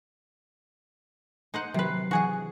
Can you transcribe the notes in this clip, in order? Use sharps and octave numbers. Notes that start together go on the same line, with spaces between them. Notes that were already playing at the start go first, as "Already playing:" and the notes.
D#4 C5 F#5
C3 D#3 F#3 B4 C7
E3 F#4 G#4 F#5 G#5